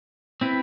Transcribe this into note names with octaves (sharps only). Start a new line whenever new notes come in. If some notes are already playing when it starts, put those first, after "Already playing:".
C4 E4 B4